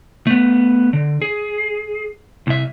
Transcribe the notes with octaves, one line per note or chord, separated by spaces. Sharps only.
A3 B3
D3
G#4
C2 E5